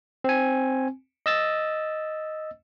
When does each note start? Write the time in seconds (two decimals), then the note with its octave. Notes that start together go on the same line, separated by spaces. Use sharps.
0.24 C4 G#5
1.26 D#5 E6 A6